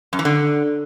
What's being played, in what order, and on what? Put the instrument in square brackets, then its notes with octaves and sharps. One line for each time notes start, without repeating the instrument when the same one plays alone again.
[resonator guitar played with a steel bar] F#2
E3
D3